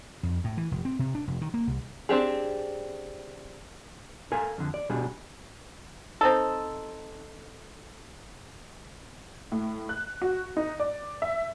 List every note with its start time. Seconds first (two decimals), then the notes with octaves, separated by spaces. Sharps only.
0.23 F2
0.44 A2
0.57 E3
0.71 F1
0.85 C4
0.99 C3
1.15 D4
1.27 F1
1.41 D#3
1.54 A#3
1.67 C2
2.09 C4 D4 G4 G#4
4.32 A4 A#4 F5 G#5
4.58 F2 D3
4.74 D5
4.89 B2 G3 D4 G#4
6.21 C4 D#4 A4
9.52 A2
9.89 F#6
10.22 F#4
10.57 D#4
10.80 D5
11.22 E5